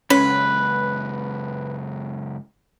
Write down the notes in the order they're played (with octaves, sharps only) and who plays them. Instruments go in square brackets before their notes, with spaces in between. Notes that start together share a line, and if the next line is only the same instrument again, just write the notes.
[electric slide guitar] F#2 C#3 G#3 [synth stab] C#4 [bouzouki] B4